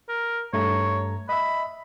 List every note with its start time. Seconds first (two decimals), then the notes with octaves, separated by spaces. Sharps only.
0.09 A#4
0.53 G2 A3 C#5 A#5
1.29 D#5 E5 B5